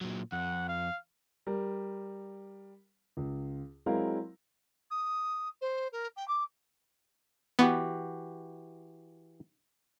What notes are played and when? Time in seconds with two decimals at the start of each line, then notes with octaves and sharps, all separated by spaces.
0.01 A#2 F#3
0.32 F2 F#5
0.69 F5
1.47 G3 A#4
3.17 C#2
3.86 F#3 G#3 C4 E4 A#4 F5
4.91 D#6
5.61 C5
5.92 A#4
6.16 G5
6.28 D6
7.59 E3 B3 F#4 G4